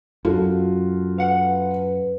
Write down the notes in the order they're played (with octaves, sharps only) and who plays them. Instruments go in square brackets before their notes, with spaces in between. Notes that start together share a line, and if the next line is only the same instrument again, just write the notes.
[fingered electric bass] F#2 [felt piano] F4 F#4 A4
[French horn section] B4 [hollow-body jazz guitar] F5 F#5